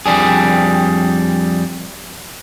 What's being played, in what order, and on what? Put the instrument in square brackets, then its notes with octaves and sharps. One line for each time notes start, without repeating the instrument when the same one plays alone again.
[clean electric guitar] F2 G3 D4 G#4